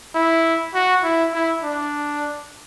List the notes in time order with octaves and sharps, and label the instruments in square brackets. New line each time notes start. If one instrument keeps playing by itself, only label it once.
[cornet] E4
F#4
E4
E4
D4